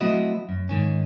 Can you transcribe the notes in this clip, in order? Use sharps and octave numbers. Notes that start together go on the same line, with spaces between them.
F#3 A3 C4 E4 F#4 D#5
F#2
G#2 D#3 C#4